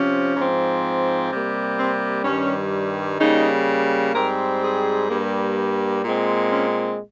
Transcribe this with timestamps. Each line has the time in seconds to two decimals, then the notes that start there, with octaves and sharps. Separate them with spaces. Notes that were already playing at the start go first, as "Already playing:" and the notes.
Already playing: C3 F3 C#4
0.37 G#2 F3 C4
1.31 C3 G3 A#3
1.78 C4
2.25 G2 D#3 G3 C#4
3.20 C#3 G3 A#3 D#4
4.14 G#2 G3 C4 A#4
4.62 G#4
5.09 G2 G3 A#3
6.04 A#2 G#3 C4
6.51 C#4